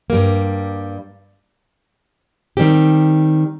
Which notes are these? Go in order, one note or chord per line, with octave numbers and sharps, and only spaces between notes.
G2 G3 A#3
D#3 G3 C4 G4